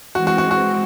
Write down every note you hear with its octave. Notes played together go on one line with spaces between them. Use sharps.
E3 G#3 C4 F#4
F#4
F#4
F#4